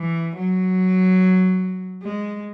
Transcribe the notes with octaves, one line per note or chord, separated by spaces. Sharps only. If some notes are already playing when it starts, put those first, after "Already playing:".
Already playing: E3
F#3
G#3